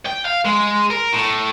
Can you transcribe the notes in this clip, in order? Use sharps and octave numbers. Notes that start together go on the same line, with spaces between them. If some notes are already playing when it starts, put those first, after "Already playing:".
G5
F5
G#3
A#4
A2